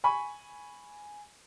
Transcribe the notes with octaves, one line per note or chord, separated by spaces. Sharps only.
G#5 B5 C#6